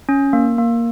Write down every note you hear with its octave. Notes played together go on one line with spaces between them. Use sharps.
C#4
A#3
A#3